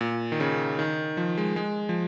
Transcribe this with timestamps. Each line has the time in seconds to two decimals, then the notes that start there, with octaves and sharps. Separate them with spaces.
0.01 A#2
0.32 D#3
0.40 C#3
0.79 D#3
1.17 F3
1.38 G#3
1.56 G#3
1.89 F3